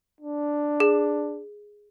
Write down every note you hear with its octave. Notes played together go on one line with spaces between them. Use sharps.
D4
G#4